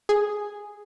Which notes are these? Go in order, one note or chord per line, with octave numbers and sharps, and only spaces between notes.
G#4